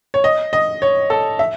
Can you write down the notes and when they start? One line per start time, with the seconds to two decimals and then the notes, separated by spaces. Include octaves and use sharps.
0.14 C#5
0.24 D#5
0.53 D#5
0.82 C#5
1.10 A4
1.39 E5